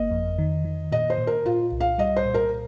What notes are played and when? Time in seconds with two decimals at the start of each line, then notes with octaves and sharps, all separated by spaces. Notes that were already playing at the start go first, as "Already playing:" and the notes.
Already playing: G1 A#3 D#5
0.11 F2
0.38 D#3
0.65 D#3
0.92 A#2 D#5
1.10 C5
1.18 A#2
1.27 A#4
1.45 A#2 F4
1.72 C2
1.81 F5
1.98 G3 D#5
2.16 C5
2.26 A#2
2.34 A#4